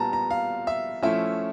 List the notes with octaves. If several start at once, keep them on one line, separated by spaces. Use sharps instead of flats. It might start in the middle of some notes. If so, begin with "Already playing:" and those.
Already playing: A#2 G3 B3 A5 A#5
A#5
F5
E5
F3 A3 C#4 E4 E5